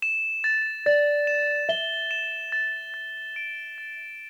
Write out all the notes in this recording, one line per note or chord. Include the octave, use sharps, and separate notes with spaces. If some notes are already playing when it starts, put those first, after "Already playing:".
E7
A6
D5 A6
E7
E5 G7
E7
A6
A6
D7
A6